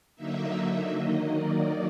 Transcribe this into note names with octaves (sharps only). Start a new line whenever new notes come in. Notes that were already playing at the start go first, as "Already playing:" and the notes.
D3 F#3 A#3 D#4 E5
D#3 F#3 A#3 D#4 D#5
D5